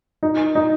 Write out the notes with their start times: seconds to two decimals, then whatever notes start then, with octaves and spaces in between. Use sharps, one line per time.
0.23 D#4
0.55 D#4